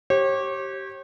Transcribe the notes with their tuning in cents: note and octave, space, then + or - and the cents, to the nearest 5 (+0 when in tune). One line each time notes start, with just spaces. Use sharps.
G4 -20 C#5 -40